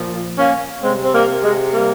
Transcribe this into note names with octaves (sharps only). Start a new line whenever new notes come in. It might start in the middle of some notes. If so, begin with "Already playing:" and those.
Already playing: A#2 F3
A#3 C#4
C3 G3 G#3 C4
C4
G3 A#3
G#3
G3 A#3